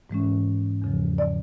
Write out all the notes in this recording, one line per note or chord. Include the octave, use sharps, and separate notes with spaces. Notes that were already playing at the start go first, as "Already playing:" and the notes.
G#2 E3 G#3 C#4
E2 C#3 F3
D5